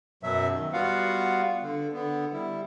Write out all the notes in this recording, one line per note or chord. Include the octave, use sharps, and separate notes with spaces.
F#2 B2 F#3 E5
D#3
G3 B3 F4 F#4 F5 F#5
D3
D3 B3
G3 E4